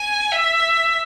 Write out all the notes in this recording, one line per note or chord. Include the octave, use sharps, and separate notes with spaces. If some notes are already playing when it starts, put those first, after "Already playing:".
Already playing: G#5
E5